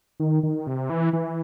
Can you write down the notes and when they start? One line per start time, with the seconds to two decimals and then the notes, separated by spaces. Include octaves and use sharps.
0.20 D#3
0.43 D#3
0.67 C3
0.90 E3
1.13 E3